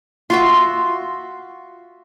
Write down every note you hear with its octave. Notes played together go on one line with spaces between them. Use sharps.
F4 F#4 E5 C6